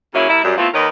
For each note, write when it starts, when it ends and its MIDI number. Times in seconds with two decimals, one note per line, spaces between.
0.14 0.27 49
0.14 0.27 54
0.14 0.27 58
0.14 0.27 61
0.14 0.27 64
0.29 0.41 55
0.29 0.41 64
0.29 0.41 70
0.29 0.41 76
0.44 0.57 42
0.44 0.57 55
0.58 0.68 57
0.58 0.68 59
0.58 0.68 60
0.58 0.68 64
0.58 0.68 65
0.74 0.88 39
0.74 0.88 51
0.74 0.88 70
0.74 0.88 71
0.74 0.88 73
0.74 0.88 75